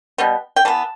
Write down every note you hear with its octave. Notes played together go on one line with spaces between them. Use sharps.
B2 G3 B3
G5
E3 B3 A5